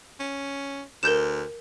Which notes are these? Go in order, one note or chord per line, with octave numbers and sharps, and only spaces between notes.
C#4
D2 A#4 G6 E7